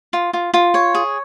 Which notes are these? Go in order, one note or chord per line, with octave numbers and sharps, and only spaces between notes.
F4
F4
F4
C#5
G#4